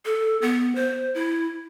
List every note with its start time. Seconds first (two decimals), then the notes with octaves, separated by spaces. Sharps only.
0.05 A4
0.42 B3
0.75 C5
1.15 E4